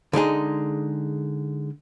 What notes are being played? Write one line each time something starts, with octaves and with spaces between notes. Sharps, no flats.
D3 G#3 D#4 G#4